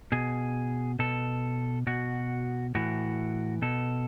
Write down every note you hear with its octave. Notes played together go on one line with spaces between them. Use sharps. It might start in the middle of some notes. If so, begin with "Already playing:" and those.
B2 G#4
B2 A4
B2 F#4
A2 E3 F#4
B2 A4